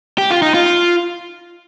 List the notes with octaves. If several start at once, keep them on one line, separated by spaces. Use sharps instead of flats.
G4
F4
D#4
F4